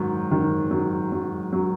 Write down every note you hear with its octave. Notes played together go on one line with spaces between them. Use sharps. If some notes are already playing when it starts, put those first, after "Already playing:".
Already playing: G#2 D#3 F#3
D#3
F#3
F#3
F#3